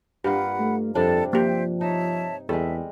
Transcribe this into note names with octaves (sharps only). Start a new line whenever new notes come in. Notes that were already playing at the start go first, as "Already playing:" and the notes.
G2 A#3 F4 G4 F#5 B5
A3
F2 C3 G3 D4 A4 D5 A5
F3 A#3 G4 C5 E5 G5
D#4 C#5 E5 A5
E2 G3 G#3 A4 E5